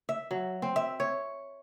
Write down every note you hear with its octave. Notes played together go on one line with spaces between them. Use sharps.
E5
F#3
C4
E5
C#5